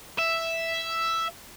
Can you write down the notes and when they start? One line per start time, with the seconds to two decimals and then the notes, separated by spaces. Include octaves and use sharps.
0.19 E5